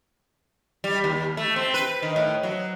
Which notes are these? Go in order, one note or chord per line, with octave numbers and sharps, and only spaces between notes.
G3
D#2
A3
C4
B4
D#3
A2
F#3